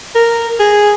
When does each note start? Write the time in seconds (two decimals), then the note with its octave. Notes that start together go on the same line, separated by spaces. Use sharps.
0.15 A#4
0.60 G#4